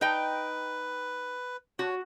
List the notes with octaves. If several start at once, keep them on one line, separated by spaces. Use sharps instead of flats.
D#4 B4 D#5 G5
F#4 C#5